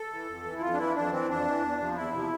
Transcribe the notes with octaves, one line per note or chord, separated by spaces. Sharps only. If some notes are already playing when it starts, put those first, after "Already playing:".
Already playing: A4
E3
F2
E3
E4
F2 F4
D4
E3 E4
F2 D4
E3 C4
F2 D4
E3
E2
C3 F3
E2 E4
C3 F3